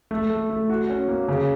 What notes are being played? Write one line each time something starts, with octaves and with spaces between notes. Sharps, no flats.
A3
A3
A3
F#4
C#4
A#3
C#3